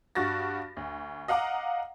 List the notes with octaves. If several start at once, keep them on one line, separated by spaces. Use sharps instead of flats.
G2 F#4 A6 A#6
D2
D#5 F5 F#5 A#5 D6